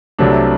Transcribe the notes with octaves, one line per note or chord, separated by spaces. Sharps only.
C2 C3 F#3 A3 D4